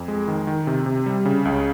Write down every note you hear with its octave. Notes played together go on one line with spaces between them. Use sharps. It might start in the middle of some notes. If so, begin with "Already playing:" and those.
Already playing: F2
G#3
D#3
D#3
C3
C3
G3
C#3
C#2